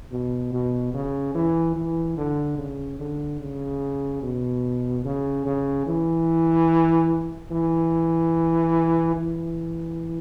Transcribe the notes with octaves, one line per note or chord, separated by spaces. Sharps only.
B2
B2
C#3
E3
E3
D3
C#3
D3
C#3
B2
C#3
C#3
E3
E3
E3